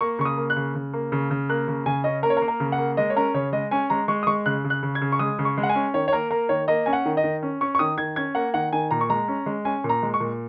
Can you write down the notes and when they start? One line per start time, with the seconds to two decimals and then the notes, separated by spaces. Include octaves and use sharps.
0.01 A#3 C#6
0.19 C#3 C#6
0.25 D#6
0.37 A#3
0.50 F#6
0.56 C#3
0.75 C#3
0.93 A#3
1.12 C#3
1.31 C#3
1.49 A#3 F#6
1.68 C#3
1.86 C#3 G#5
2.04 C#4 D#5
2.23 A#3 A#4
2.30 C#5
2.37 A#4
2.42 A#3
2.48 A#4
2.60 C#3
2.72 F#5
2.78 A#3
2.97 G#3 D#5
3.10 C#5
3.16 C#4 A#4
3.34 C#3 C#5
3.52 G#3 D#5
3.71 C#4 G#5
3.90 G#3 A#5
4.08 G#3 C#6
4.23 D#6
4.27 G#3 C#6
4.46 C#3 F#6
4.64 C#3
4.70 F#6
4.83 C#3
4.95 G#6
5.01 C#3
5.12 C#6
5.19 G#3 D#6
5.39 C#3
5.45 C#6
5.58 G#3
5.63 F#5
5.69 G#5
5.75 C#4
5.94 D#3 C#5
6.08 C#5
6.12 A#3 A#4
6.31 A#3 A#4
6.49 D#3 C#5
6.68 A#3 D#5
6.86 C#4 G#5
6.93 F#5
7.06 D#3
7.17 D#5
7.24 D#3
7.43 C#4
7.61 C#4 C#6
7.75 C#6
7.79 D#3 D#6
7.98 D#3 G#6
8.16 C#4 G#6
8.35 A#3 F#5
8.54 D#3 F#5
8.73 D#3 G#5
8.91 A#2 A#5
9.01 C#6
9.10 G#3 A#5
9.28 C#4
9.46 G#3
9.65 C#4 G#5
9.84 A#2
9.89 A#5
10.03 G#3
10.14 C#6
10.20 A#2